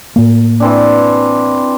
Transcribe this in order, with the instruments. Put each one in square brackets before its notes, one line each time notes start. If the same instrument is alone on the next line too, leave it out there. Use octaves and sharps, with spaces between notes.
[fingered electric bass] A2 A#3
[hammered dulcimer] E3 C4 D4